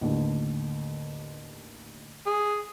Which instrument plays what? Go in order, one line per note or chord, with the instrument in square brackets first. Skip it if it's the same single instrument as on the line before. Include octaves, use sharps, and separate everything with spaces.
[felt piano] A1 D#2 D3
[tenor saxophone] G#4